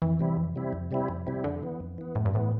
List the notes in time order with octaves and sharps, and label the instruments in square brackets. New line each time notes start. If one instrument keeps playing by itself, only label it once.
[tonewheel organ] F2 [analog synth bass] E3
[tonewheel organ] C3 G3 C4 E4
F2
C3 G3 C4 E4
F2
C3 G3 C4 E4
F2
C3 G3 C4 E4
[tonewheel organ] F2 [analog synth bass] D3
[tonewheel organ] E3 B3
F2
E3 B3
[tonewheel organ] F2 [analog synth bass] A2
[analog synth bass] G2
[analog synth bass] A2 [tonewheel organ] E3 B3